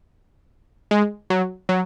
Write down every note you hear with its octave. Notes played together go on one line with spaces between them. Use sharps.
G#3
F#3
F#3